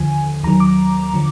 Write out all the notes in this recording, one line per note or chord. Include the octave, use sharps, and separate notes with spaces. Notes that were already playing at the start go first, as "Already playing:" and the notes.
Already playing: D#2 D3 F3 G#5
D#2 D#3 F#3 A#5
D6
D3 F3